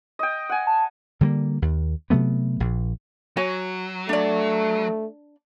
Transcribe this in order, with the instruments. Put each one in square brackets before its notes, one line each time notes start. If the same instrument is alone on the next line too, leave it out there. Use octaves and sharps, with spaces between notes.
[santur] D#5 G5
F#5 G#5
[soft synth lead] A5
[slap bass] D3 G3 G#3 A#3
D#2
C3 F#3 A3 B3
A#1
[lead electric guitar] F#3 [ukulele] F#4 C#5 G#5
[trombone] A3 [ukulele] D4 D5